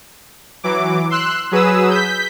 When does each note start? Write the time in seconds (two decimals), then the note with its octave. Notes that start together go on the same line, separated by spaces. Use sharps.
0.63 E3 F#3 D6
1.10 C6 E6 F#6
1.51 F#3 G#4 B4 D#6 E6
1.91 G6 B6